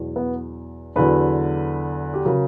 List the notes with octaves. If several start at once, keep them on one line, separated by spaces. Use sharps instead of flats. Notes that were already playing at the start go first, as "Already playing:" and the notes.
Already playing: E2 B2 F#3
B3
E2 D3 F#3 B4
G4
C#3 F#3 A#4